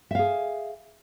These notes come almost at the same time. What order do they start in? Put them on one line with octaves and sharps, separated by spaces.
E5 F5 G#4